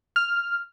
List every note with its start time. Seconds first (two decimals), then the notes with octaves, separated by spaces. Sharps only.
0.16 F6